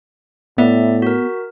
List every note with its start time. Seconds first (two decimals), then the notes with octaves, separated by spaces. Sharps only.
0.58 A2 B3 D5 E5
1.02 F#4 A#4